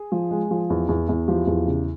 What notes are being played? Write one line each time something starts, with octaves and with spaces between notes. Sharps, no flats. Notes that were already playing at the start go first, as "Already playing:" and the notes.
Already playing: G#4
F3
G#3
F3
E2
E2
E2
F3 G4
E2
C#3